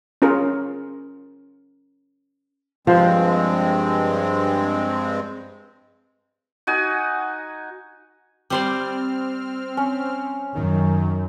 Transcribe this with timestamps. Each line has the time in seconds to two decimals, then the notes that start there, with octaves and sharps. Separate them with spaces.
0.22 C#4 F4 G#4 A#4
2.87 G2 F3 G#3 C4 C5
6.67 D#4 F#4 G#5
8.50 G3 C4 C5 D5 F6
9.77 C#4
10.55 F#2 D#3